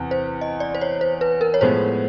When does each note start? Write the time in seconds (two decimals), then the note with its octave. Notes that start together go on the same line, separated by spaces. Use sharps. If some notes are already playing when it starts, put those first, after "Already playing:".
Already playing: E2 C3
0.11 C5
0.41 D#5
0.60 D5
0.75 C5
0.81 C#5
1.01 C5
1.21 B4
1.41 A#4
1.54 C#5
1.61 A2 F3 G#3 B3 C5